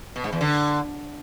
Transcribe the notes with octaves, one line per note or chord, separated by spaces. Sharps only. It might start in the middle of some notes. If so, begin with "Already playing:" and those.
B2
G#2
E2
D3